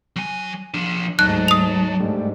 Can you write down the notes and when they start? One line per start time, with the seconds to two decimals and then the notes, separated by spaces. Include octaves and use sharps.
0.16 F#3 G#5
0.74 F3 D4
1.19 D2 G#2 F#3 D#4 A5 F#6
1.48 D#6 F7
2.00 G#2 G3 A3 D4